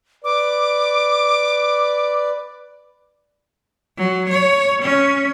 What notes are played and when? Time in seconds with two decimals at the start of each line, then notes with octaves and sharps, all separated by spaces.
0.24 B4 D5 D6
3.98 F#3
4.30 C#5
4.83 C#4